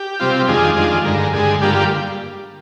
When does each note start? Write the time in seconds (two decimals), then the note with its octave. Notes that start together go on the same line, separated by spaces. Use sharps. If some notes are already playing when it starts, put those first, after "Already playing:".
Already playing: G4
0.20 C3 G3 C4 F4
0.39 G4
0.48 F2 D#3 G#3 D4 F4 G#4
0.76 F2 D#3 G#3 D4 F4
1.04 G2 D3 G#3 A#4
1.19 A#4
1.33 G2 D3 G#3 G#4
1.61 G2 D3 G3 A#3 F4 G4
1.76 G4